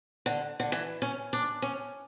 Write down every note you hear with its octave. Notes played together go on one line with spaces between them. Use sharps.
D3
D3
E3
C#4
D4
C#4